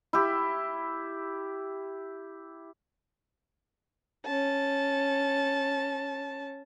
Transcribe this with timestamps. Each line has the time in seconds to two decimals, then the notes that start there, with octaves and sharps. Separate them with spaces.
0.13 E4 G4
4.25 C#4 A5